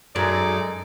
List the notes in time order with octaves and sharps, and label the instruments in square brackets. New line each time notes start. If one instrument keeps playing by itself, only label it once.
[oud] F#2 [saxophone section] G#3 A4 D5 [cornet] D#4